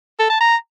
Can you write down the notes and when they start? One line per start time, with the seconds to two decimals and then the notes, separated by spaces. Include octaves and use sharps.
0.19 A4
0.30 A5
0.41 A#5